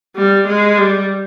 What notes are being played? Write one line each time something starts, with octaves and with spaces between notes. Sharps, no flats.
G3
G#3
G3